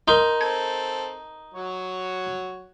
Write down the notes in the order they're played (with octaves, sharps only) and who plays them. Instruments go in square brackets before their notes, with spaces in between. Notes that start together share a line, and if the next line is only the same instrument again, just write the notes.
[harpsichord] D#4 [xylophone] A#4 C6
[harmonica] C4 A4 [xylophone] G#6
[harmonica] F#3 F#4 C#5